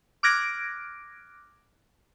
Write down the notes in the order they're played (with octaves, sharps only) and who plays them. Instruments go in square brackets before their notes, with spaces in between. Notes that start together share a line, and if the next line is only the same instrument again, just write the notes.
[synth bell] D6 F6 F#6 G#6 A#6 D7